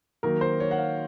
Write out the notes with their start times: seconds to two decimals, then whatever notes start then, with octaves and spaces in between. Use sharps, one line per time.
0.23 D#3 F#3 A#3 D#4 A#4
0.41 C5
0.60 C#5
0.71 F#5
0.78 F5